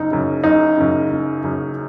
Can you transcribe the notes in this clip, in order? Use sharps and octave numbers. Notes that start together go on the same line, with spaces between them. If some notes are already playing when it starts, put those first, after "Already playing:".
Already playing: F#1 D#4
F#2 C#3
F#1 D#4
F#2 C#3
F#1
F#2 C#3